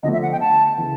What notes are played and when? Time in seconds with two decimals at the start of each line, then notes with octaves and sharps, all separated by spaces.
0.03 D3 F3 A3 D#5
0.13 E5
0.22 F#5
0.32 G5
0.41 A5
0.77 C#3 E3